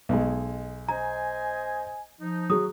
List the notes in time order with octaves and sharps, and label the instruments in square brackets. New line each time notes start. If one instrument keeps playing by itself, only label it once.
[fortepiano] B1 G#3
[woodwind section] C5 D#5 G#5 [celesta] A#5
[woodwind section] F3 D#4
[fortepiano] F#3 [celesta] G#4 D#6